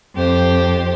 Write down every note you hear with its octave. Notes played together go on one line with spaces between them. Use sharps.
F2 G4 C5